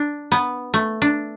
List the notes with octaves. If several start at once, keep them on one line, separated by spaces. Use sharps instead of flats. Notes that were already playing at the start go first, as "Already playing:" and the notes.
Already playing: D4
B3
A3
D4